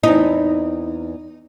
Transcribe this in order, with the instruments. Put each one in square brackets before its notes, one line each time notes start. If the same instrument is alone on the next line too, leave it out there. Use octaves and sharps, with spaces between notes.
[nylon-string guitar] E2 C4 E4 [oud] D#4